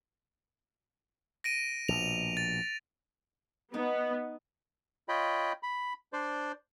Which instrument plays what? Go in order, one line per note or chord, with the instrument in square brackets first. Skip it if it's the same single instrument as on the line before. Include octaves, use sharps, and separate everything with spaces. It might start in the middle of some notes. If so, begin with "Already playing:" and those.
[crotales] A#6 D7 D#7
[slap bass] A#1 B2 [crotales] F7
[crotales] A6
[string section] B3 [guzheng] D#4
[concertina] F4 C#5 D#5 G5 B5
B5
D4 C5 D5 C6